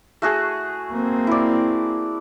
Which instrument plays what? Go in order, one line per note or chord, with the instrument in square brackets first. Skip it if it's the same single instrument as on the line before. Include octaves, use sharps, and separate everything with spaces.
[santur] A3 F#4 G#4
[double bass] A#3 C4
[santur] E4 D5